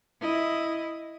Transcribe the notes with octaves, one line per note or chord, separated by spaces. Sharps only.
E4 D#5